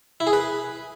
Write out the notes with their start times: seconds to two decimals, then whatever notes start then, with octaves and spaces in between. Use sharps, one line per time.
0.20 E4
0.27 G#4
0.33 B4